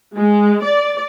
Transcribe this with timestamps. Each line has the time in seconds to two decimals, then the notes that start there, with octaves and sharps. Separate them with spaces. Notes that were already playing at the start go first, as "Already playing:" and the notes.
0.16 G#3
0.65 D5